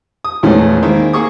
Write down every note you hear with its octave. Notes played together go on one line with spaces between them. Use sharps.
D#6
A#1 E2 F3 G#3 A3 C#4
D#3 G#3 A#3 C4 E4
A#3 G#4 C#6 D#6